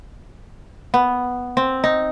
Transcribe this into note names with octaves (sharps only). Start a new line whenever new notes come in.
B3
C4
D#4